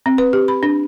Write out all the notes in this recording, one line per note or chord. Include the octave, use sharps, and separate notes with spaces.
C4
B4
G4
B5
D4